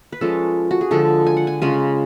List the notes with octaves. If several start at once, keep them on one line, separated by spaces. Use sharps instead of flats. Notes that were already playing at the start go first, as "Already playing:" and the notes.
B4
F3 G#3 C#4 A4
F#4
G#4
D3 F3 G#3 A4
G#5
F#5
G#5
C#3 G#3 C#4 F4 G#5